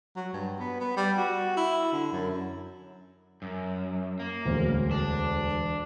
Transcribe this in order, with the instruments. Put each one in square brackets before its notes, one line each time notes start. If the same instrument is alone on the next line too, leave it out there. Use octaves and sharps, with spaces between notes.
[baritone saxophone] F#3
G2
B3
B3
G3
F#4
E4
D3
F#2
[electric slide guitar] F#2
A#3
[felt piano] E1 D2
[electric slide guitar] D4